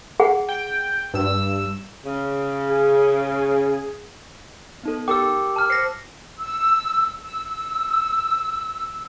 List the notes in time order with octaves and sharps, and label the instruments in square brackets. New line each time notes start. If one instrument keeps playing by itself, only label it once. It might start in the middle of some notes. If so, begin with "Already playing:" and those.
[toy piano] G#4 F#5
[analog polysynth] G5
G2 E6
[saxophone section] C#3
[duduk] G#4
[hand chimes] B3 D#4 A4
[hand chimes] G4 A#4 G5 [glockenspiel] D6 E6
[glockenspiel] A5 F6
[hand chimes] C5 C#7 [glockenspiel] A#6 C7
[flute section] E6
E6